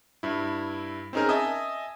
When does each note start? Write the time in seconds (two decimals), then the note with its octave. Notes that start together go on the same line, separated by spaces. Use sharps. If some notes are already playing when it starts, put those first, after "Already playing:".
0.23 G2 E4
1.13 C4 C#4 D#4 G#4 A#4
1.29 D#5 E5 G#5 A5 D#6